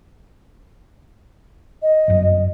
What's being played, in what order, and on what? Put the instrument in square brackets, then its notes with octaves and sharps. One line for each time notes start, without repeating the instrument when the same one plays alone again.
[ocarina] D#5
[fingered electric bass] G1 F#2